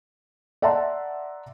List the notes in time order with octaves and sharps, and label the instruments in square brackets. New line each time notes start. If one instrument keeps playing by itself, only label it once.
[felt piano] D5 E5 F#5 A5 A#5 C6